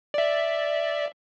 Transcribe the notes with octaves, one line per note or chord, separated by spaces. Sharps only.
D5 E5